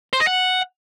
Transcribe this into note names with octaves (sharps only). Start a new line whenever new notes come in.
C5
D#5
F#5